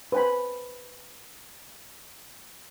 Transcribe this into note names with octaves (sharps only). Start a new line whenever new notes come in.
B4 C5 G5 G#5 B5